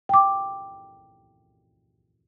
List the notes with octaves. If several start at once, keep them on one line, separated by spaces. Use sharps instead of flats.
G5 D6